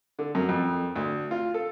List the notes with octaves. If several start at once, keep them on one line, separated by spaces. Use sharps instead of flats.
D3
F#2
F2
D2
F4
A4